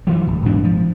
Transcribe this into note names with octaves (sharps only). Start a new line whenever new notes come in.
G2 E3 F#3
D1
A1 G#2 B2 D4
F3